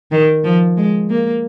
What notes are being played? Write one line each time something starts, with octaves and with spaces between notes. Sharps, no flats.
D#3
F3
G#3
A#3